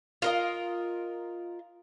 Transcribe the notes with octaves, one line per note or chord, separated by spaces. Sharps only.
F4 A#4 D#5